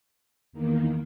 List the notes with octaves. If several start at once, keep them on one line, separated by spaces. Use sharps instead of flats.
E2 D#3 A#3